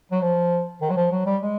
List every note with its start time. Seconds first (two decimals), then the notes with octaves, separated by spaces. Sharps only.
0.12 F#3
0.21 F3
0.82 D#3
0.90 F#3
0.96 F3
1.11 F#3
1.26 G3
1.42 G#3